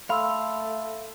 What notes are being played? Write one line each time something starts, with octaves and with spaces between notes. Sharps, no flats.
A3 F5 B5 C6 E6